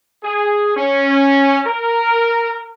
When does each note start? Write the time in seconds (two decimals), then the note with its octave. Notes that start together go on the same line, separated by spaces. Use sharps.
0.24 G#4
0.77 C#4
1.66 A#4